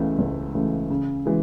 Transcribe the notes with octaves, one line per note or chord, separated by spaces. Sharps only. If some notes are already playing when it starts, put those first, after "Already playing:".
Already playing: C#2 C#3 E3 A3
C#2
C#3 E3 A3
C#3
E3 G#3